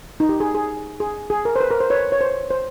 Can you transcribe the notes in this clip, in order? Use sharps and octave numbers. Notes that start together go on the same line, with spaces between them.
D#4
G4
G#4
G#4
G#4
G#4
A#4
C5
B4
A#4
C5
B4 C#5
C#5
C5
C5